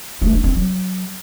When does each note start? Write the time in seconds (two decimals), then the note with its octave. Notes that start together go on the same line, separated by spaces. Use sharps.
0.22 A3
0.33 D4
0.44 C4
0.55 F#3